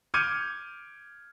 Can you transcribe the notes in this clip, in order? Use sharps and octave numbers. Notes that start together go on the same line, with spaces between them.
D6 F6 G6 G#6 C#7 D#7